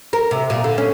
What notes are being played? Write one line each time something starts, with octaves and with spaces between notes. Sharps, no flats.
A#4
C3
A#2
D3
C#4